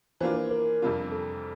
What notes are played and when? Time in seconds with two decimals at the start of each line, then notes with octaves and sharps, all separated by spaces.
0.20 E3 A#3 D4 F4 C5
0.36 C5
0.51 A#4
0.82 F2 C3 G3 D4 F4
1.12 A4